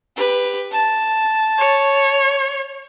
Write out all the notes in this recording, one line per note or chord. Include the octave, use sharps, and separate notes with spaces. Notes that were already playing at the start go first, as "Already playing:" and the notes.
G4 B4
A5
C#5